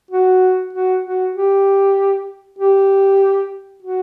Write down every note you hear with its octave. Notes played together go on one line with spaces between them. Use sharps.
F#4
F#4
F#4
G4
G4
F#4